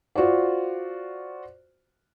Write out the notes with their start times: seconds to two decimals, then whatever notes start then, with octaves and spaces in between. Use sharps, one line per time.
0.15 F4 F#4 C5 D5